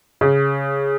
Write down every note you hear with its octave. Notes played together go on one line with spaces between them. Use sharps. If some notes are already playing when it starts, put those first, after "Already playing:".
C#3